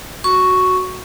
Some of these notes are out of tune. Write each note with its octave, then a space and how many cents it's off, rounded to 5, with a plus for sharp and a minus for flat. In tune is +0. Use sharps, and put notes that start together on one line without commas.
F#4 +0 C#6 +0